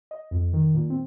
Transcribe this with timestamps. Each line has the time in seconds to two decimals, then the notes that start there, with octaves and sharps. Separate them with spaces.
0.11 D#5
0.31 F2
0.53 D#3
0.74 A#2
0.90 C4